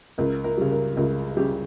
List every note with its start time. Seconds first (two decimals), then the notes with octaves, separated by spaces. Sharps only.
0.18 C#2 A#4
0.44 A#4
0.57 C#3 G3
0.71 A#4
0.97 C#2 A#4
1.37 C#3 G3 G4